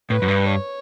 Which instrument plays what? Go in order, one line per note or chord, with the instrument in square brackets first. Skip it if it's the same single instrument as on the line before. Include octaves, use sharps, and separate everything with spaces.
[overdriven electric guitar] A2 [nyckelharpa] B4
[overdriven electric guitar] F#2
G2
[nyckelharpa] C#5